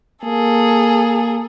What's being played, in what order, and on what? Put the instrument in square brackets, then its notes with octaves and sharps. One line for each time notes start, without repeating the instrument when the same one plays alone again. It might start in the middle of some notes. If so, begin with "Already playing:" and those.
[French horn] A#3 [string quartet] G#4 A4